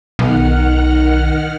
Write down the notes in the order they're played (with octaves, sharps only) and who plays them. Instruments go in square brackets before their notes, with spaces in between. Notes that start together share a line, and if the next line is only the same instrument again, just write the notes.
[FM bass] B1 [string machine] D#3 F#5 F6